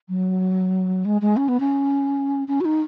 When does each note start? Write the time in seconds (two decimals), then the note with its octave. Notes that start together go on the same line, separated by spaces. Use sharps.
0.09 F#3
1.05 G#3
1.21 G#3
1.37 C#4
1.48 B3
1.60 C#4
2.48 C#4
2.61 F#4
2.65 D#4